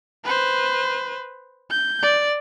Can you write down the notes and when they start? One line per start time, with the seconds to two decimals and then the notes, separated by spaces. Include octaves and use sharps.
0.24 B4 C5
1.70 G6
2.03 D5